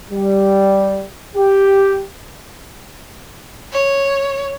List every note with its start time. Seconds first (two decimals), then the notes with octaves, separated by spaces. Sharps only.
0.11 G3
1.36 G4
3.72 C#5